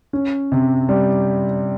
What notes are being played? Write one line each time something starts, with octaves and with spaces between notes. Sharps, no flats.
C#4
C3
G3